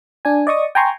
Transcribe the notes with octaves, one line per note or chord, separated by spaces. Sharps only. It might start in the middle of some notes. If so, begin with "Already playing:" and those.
D4 G#5
D5 D#5 C#6 D#6
G5 G#5 A#5 C6 C#6